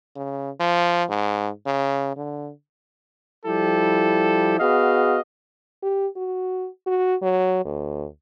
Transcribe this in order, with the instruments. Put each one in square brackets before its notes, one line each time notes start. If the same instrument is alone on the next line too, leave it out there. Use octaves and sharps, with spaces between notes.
[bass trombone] C#3
F3
G#2
C#3
D3
[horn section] F3 G3 E4 G4 A4
B3 F#4 G#4 D#5 F5
[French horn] G4
F#4
F#4
F#3
D2